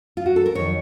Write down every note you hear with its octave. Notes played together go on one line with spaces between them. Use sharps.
F4
F#4
A4
A#4
F2 D#3 F#3 C#5